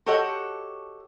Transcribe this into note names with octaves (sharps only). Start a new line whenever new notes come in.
F#4 G4 A4 C#5 D#5 F#5